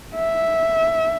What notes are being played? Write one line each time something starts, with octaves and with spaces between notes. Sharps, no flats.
E5